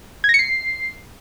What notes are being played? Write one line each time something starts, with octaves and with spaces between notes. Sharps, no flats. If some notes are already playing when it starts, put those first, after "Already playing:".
G#6
A#6
C#7
C7